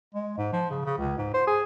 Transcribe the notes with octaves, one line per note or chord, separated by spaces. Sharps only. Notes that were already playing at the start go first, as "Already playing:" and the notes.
G#3
G#2
F3
C#3
C#3
C#2
G#2
C5
G#4